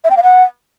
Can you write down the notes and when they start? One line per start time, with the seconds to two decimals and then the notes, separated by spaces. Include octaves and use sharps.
0.04 E5
0.10 G5
0.17 F5
0.23 F#5